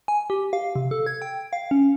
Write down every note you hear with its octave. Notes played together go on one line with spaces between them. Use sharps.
G#5
G4
F5
C3
A4
G#6
G5
F5
C#4